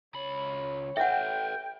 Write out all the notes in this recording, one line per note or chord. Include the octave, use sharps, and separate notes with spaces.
C#2 C#5 B5
A4 B4 E5 F#5 G5